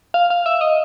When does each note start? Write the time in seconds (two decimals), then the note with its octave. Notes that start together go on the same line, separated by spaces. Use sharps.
0.14 F5
0.30 F5
0.46 E5
0.61 D#5